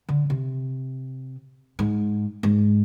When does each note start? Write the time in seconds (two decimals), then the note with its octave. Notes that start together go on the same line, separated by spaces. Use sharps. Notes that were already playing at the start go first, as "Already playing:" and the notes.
0.09 D3
0.30 C3
1.79 G#2
2.43 G#2